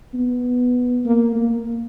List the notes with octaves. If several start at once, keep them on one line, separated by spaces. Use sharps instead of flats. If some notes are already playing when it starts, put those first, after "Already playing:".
B3
A#3
A#3